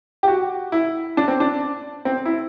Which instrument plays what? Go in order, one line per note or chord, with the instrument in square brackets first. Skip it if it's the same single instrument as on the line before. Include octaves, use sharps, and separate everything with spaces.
[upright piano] G4
F#4
E4
D4
C4
D4
C4
E4